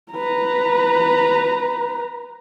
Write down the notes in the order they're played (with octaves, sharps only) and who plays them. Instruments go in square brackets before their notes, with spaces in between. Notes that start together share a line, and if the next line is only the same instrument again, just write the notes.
[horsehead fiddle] B4 A#5